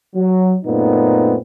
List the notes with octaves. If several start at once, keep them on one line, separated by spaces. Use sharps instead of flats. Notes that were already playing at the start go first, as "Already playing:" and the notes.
F#3
F#2 A#2 A3 B3 C4 D#4